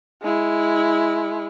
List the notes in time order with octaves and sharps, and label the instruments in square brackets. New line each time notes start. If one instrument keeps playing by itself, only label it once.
[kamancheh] G#3 E4